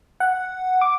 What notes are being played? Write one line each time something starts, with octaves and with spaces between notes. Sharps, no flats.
F#5
D6